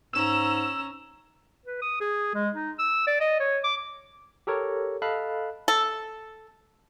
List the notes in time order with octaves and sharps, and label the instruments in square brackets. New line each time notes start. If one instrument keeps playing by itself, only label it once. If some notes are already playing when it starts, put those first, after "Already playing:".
[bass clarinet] G#2 [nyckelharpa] C#4 A#5 [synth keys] E6 E7
[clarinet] B4
D#6
G#4
G#3
D#4
E6
D5
D#5
C#5
D6
[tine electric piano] G4 A4 A#4 C#5
A4 D#5 F5 A5 B5 F#6
[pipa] A4